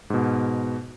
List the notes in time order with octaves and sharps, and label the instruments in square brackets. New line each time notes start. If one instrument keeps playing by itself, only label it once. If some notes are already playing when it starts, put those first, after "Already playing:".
[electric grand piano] G#2 B2